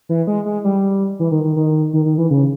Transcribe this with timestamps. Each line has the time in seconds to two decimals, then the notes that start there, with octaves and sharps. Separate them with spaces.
0.09 E3
0.27 G#3
0.46 G#3
0.64 G3
1.20 E3
1.31 D#3
1.44 D#3
1.56 D#3
1.93 D#3
2.05 D#3
2.18 E3
2.30 C#3